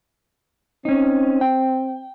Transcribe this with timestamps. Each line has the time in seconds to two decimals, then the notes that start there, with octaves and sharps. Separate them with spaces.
0.85 C4 C#4 D#4
1.41 G5